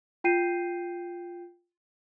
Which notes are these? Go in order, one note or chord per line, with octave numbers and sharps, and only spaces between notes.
F4 G5 G6 C7 D#7